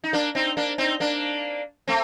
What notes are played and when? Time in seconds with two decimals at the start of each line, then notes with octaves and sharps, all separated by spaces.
0.04 D#4
0.13 A#3 D4
0.35 C4 D#4
0.57 A#3 D4
0.78 C4 D#4
1.00 A#3 D4
1.88 A3 C4